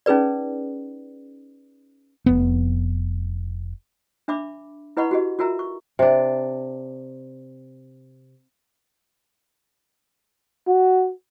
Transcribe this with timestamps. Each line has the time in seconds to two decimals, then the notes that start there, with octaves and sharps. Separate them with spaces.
0.06 C#4 D#4 G#4 B4 D5
2.26 F1 B3
4.28 D4 E5 B5 D6
4.97 E4 B4 D#5 F#5 B5 C#6
5.11 F#4 G4 D#5
5.39 F4 F#4 A#4 E5 A#5
5.59 C#6
5.99 C3 D4
10.67 F#4